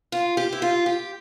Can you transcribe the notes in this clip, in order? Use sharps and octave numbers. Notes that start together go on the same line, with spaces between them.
F4
G4
E4
F4
G4